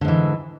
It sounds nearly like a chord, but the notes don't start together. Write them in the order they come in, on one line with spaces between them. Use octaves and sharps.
D3 G#2 E3